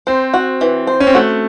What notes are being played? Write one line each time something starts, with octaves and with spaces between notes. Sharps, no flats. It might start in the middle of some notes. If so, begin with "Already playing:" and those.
C4 C5
F#4
E3
C5
C#4
C4
A3 F#4